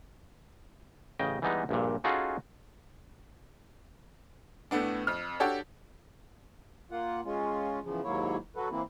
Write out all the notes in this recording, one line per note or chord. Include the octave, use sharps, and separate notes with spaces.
A1 C#3 D#5 G5
E3 G3 G#3 B3 D#4
A#1 G2 A#2
C#4 D#4 F4 F#4 G#4 A4
A2 A3 B3 D4
F2 F6
D4 F#4 G4 A4 C#5
A#3 F4 F#5
G#3 C#4 F4
E2 C#3 F3
D#2 G#2 F#3 A#3 E4 C#5
F#3 F#4 A4 B4
E3 A#3 C4 E4